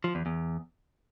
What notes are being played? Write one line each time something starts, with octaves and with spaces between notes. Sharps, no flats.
F3
E2
E2